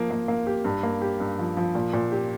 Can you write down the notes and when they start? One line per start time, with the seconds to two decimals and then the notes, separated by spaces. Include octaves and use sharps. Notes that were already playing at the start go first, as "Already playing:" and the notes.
Already playing: F3 A#3
0.11 A#3
0.28 A#3
0.47 G4
0.65 G2
0.83 A#3
1.01 G4
1.20 G2
1.39 F3
1.57 F3
1.75 A#2
1.93 A#2
2.12 G4